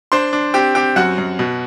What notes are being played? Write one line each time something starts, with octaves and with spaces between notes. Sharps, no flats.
D4 C5 C6
D4
C4 G4 G5
C4 G4 G5
F#2 F#4 F#5
F#2
B2